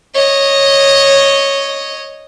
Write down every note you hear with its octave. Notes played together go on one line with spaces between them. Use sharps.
C#5 D#5